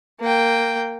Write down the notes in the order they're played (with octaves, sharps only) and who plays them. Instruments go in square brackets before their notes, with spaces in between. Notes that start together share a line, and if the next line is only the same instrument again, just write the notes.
[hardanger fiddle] A#3 G5